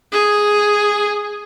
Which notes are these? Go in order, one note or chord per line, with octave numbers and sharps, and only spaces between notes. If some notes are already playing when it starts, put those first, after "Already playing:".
G#4